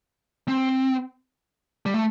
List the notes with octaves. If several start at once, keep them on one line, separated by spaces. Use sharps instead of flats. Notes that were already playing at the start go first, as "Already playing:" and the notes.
C4
G3
A3